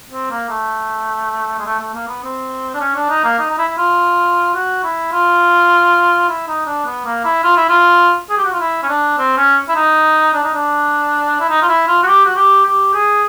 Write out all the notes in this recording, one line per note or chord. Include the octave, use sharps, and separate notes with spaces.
C4
A#3
A3
G#3
A3
A3
A#3
B3
C4
D4
C#4
D4
D#4
A#3
D#4
D#4
E4
E4
F4
F#4
E4
F4
E4
D#4
D4
B3
A#3
E4
F4
E4
F4
G#4
G4
F#4
F4
E4
C#4
D4
C4
C#4
E4
D#4
D4
D#4
D4
E4
D#4
F4
E4
F4
F#4
G4
F#4
G4
G4
G#4